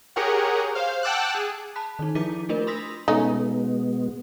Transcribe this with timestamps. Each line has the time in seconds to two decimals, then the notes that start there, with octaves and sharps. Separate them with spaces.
0.16 G4 G#4 A#4 C#5 F#5
0.75 C5 F5
1.03 F#5 G5 A5 D6 E6 F#6
1.35 G#4
1.76 A5 B5 F#6 B6
1.99 D#3 D#4
2.15 F3 E4 G#4 D6 B6 D#7
2.49 A3 D4 F4 A#4
2.67 B5 C6 D#6 E6 A#6 B6
3.08 B2 G#3 A3 B3 C#4 D#4